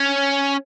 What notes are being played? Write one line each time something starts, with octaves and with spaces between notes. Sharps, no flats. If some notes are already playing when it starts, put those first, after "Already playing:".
Already playing: C#4